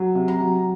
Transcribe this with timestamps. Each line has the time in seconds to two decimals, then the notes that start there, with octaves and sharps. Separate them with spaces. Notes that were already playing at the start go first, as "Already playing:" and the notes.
Already playing: F#3
0.15 C3
0.28 A#5
0.40 F#3